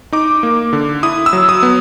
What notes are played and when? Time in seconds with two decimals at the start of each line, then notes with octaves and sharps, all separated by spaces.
0.12 D#4 D6
0.43 A#3
0.73 D3
1.03 E4 D#6
1.26 E6
1.33 F#3
1.49 D#6
1.63 B3